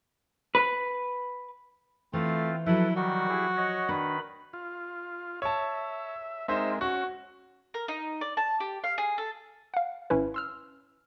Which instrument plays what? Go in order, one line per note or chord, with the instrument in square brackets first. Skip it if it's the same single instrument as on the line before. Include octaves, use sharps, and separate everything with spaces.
[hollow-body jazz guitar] B4
[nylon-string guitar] E3 [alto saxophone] A3 [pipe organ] C4 F4
[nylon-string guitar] F3 F#3 [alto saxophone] E4 [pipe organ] A4 B4
[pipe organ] D#3 G3 [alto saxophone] F#4
[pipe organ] E4 G4 G#4
C#5 D#5 F#5
[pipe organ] D#3 B4 B5 [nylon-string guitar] D4
[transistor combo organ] F4
[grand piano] C#5 A5 [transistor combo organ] E5
[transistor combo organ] G#3 C4 A#4 [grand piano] D#4 C5 E5
[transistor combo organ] C#4 [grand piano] F#4
[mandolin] A#4
D#4
D5
A5
G4
F5
G#4
A4
[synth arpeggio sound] F5 F#5
G#1 C#4 E4 B4
C6 E6 F6